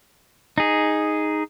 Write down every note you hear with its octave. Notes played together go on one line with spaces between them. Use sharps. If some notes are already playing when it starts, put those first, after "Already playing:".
D#4 G#4